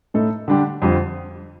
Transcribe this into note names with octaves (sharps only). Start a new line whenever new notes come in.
A2 A3 D#4 A4
D3 G3 D4 G4
F2 D3 G3 C4 F4